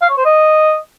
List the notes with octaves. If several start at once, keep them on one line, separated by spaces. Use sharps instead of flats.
F5
C#5
C5
D#5